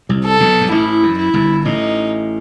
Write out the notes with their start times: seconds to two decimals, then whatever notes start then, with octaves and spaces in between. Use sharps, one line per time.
0.09 C2 C3
0.25 A4
0.40 B1 B2
0.61 G2
0.71 A1 A2 E4
1.03 F#2
1.18 E4
1.34 G1 G2
1.65 A1 A2 D#4